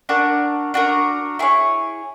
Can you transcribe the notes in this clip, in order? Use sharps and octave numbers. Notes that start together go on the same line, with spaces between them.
D4 F#4 A#4
D4 F#4 A#4
E4 G#4 C#5